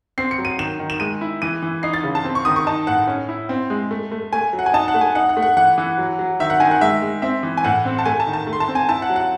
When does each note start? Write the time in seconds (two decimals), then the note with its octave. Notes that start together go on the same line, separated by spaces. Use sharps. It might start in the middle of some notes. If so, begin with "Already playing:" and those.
0.18 C4 C7
0.31 C#7
0.38 F#3
0.45 D#7
0.58 D#3 E7
0.79 D#3
0.90 E7
1.00 G#3 D#7
1.21 E4
1.42 E3 D#7
1.62 E3
1.83 D#4 C7
1.94 A6
2.03 C#3
2.15 A5
2.24 C4
2.35 C#6
2.45 D#3 D#6
2.56 C#6
2.66 D#4 A5
2.87 A2 F#5
3.07 C#4
3.29 E4
3.49 C4
3.70 G#3
3.91 A3
4.12 A3
4.33 A3 G#5
4.53 F#3
4.59 F#5
4.66 G#5
4.73 D#4 A5
4.88 F#5
4.94 A3
5.01 G#5
5.15 D#4 F#5
5.29 F#5
5.37 A3
5.42 F#5
5.57 E3 F#5
5.78 E3
5.98 F#3
6.19 F#3
6.40 D#3 E5
6.50 F#5
6.60 D#3 G#5
6.71 F#5
6.81 G#3 E5
7.02 G#3
7.22 C4 E5
7.43 E3
7.57 G#5
7.64 A2 F#5
7.85 C4
7.99 A5
8.05 A3 G#5
8.20 A5
8.27 D#3
8.33 A5
8.47 A3
8.53 C6
8.60 A5
8.68 C4
8.75 G#5
8.89 E4 A5
9.02 F#5
9.10 F#3
9.16 F#5